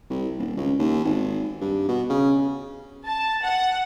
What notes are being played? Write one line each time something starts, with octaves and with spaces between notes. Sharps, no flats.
C2
D#1
C#2
D#2
G#1
G2
B2
C#3
A5
F#5